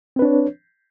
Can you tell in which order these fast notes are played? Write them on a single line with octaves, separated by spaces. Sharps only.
C4 B4 D4 C#5